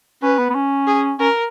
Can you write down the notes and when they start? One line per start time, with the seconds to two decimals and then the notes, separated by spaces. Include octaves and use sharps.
0.22 C#4 B4
0.39 B3
0.50 B3
0.55 C#4
0.87 G#4
1.19 C#4 A#4